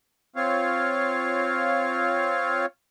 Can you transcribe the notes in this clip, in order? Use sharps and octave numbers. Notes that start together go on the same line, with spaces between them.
C4 F4 C#5 F5